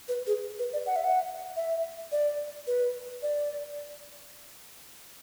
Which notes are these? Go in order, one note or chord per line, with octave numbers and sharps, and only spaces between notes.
B4
G#4
B4
D5
F#5
E5
F#5
E5
D5
B4
D5